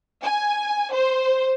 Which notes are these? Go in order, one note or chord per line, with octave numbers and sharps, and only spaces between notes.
G#5
C5